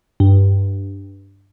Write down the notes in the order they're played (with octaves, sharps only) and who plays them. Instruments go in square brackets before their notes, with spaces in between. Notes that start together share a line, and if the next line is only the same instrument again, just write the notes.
[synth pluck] G2